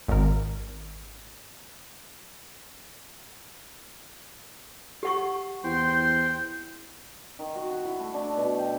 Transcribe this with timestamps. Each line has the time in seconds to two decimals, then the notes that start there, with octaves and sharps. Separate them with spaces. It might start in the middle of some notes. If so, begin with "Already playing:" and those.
0.08 G#1 A#4
5.03 G4 F#5 C#6
5.64 E2 C5 G5 C6
7.39 D#3
7.55 F#4
7.71 F#4
7.85 E4
7.99 A3
8.14 D4
8.37 B2
8.58 G5